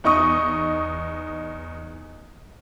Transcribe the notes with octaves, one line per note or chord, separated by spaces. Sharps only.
E2 D#4 C#6 D#6